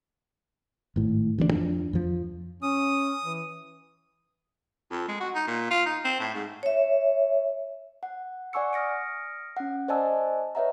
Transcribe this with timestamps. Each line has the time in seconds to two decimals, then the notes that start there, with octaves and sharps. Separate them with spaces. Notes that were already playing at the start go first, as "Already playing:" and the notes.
0.96 G#1 A2
1.38 D2 E3 A3 D4
1.51 F2 F3 D4
1.93 F2 F3
2.62 C#4 D#6
3.23 E3
4.91 F2
5.08 G#3
5.20 F#4
5.34 D#4
5.47 A#2
5.71 F4
5.86 D#4
6.05 C4
6.20 A2
6.34 G#2
6.63 C#5 E5
8.03 F#5
8.53 D5 F#5 G#5 C#6 E6 C#7
8.73 D#6 F6 A#6 C#7 D7
9.57 C#4 F#5
9.88 C5 D5 D#5 G#5 A5 E6
10.55 B4 C#5 D#5 E5 F#5 A#5